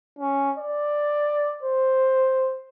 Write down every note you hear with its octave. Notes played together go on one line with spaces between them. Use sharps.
C#4
D5
C5